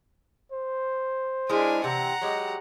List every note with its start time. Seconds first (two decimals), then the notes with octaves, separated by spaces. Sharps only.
0.52 C5
1.50 G#3 D4 E4 A#4 G#5
1.84 C3 E3 F#5 A#5
2.21 F#3 G#3 G4